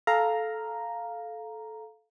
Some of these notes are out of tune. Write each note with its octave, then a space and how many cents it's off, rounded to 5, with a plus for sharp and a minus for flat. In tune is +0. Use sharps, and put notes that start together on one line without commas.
A4 -15 F5 +0 A#5 +0